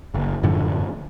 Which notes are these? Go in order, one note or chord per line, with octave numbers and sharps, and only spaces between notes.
F#1
F#2 A2 D3 F3